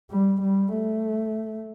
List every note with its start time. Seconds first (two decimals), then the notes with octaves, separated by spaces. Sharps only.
0.11 G3
0.42 G3
0.74 A3